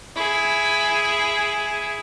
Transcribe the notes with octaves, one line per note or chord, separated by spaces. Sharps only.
E4 G#4